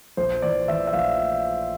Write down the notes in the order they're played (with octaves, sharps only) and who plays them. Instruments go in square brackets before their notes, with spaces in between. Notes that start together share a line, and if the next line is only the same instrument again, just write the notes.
[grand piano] A#1 C5
E3 D5
E3 E5
E5
A#1 F5